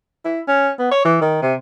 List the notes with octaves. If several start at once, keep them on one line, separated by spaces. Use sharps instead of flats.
E4
C#4
B3
C#5
E3
D#3
C3